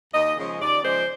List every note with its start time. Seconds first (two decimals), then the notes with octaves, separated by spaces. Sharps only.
0.13 D#2 D#5
0.37 C#3 F3 G#3 C#4
0.61 D#2 D5
0.83 C#3 F3 G#3 C#4 C5